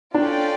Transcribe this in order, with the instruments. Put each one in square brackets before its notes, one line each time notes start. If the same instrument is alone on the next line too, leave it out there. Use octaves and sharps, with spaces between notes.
[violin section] C#4 F4 A4 D5 G5 [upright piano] D4